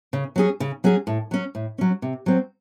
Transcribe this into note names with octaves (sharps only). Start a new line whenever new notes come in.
C#3
F#3 C#4 G#4
C#3
F#3 C#4 G#4
A2
F#3 C#4
A2
F#3 C#4
C3
F#3 C4